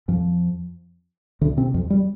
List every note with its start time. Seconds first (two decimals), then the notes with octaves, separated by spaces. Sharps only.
0.08 F2 F3
1.41 D2 D3
1.57 C3 C4
1.74 F2 F3
1.90 G3